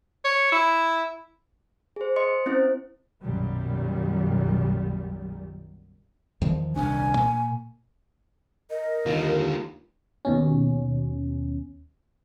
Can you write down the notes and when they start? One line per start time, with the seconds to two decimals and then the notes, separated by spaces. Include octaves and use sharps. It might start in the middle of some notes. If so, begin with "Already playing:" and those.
0.25 C#5
0.52 E4
1.96 G#4 C5
2.16 D#5 C6 C#7
2.46 C4 C#4 E4 C5
3.22 B1 F#2 A#2 D#3 F#3 G3
6.42 E2 D#3 F3
6.76 D#1 C2 D4 G#5
7.15 A#2 A#3
8.70 A#4 D#5
9.06 D#2 D3 F4
10.25 D#2 B2 C#4